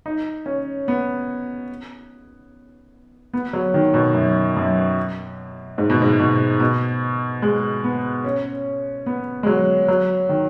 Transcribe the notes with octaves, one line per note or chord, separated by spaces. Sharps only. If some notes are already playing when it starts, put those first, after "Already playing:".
D#4
C#4
B3
B3
F#3
D#3
B2
F#2
F#2
G#2
B2
G#2
B2
B2
G#3
B3
C#4
B3
G#3
F#3
F#3
D#3